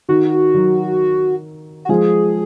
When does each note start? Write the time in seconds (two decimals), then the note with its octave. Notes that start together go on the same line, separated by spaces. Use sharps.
0.09 D#3 F#4
0.54 D#3 F#3
1.85 F#4
1.89 F3 G#3 G#4